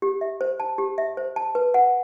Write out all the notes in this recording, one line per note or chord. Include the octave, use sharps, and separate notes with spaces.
G4
E5
C5
A5
G4
E5
C5
A5
B4
F#5